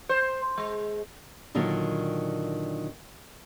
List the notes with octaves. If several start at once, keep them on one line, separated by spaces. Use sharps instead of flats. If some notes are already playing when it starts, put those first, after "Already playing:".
C5
G#3
A#2 D3 D#3 F#3 A#3